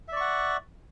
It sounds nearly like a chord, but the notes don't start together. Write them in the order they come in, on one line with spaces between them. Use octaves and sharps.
E5 D5 C#6 F#5